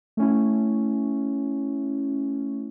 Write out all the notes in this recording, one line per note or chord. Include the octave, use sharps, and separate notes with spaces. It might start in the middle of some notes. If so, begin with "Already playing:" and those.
A3 C#4 E4